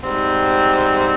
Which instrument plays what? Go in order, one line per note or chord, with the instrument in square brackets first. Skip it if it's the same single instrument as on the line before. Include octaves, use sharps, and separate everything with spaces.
[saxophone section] G#2 G3 C4